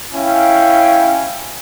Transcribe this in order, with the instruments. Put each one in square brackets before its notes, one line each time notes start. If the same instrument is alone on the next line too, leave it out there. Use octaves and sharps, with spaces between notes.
[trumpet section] C#4 E4 F5 G5 G#5